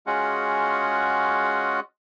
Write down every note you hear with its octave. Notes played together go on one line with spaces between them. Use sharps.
G#3 C#4 F4 F#4 G#4 F#5